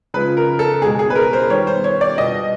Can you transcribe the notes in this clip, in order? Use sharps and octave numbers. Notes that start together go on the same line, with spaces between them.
C#3 F3 G#3 B4
A#4
A4
B2 G#3 B3 G#4
G#4
B4
A#4
C5
D#3 G3 B3 C#5
C5
C#5
D5
B2 G3 B3 D#5